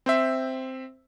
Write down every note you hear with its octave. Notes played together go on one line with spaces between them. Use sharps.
C4 C5 E5